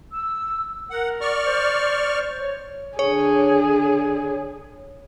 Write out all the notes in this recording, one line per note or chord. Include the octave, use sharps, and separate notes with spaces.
E6
A#4 F#5
D5 C#6 F6
C5
C#5
D3 G#4 C#5